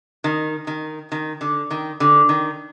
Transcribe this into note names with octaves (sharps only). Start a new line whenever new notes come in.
D#3
D#3
D#3
D3
D#3
D3
D#3